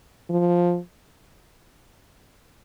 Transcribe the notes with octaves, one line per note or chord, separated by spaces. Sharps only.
F3